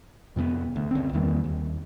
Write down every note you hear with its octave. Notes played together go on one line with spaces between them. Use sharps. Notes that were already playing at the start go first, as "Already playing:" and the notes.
F2 C3 A#3 B3
D2
C#2 C4
E2 D#3 G3 A#3
D#2